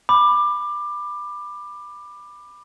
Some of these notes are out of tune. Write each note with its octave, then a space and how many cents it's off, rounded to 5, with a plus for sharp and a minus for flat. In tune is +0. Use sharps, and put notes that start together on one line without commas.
B5 +0 D6 +20